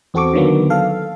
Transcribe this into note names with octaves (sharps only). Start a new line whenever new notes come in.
E2 C4 F#4 A4 C#6 D6
D3 D#3 F#3 A#3 B3
A4 F5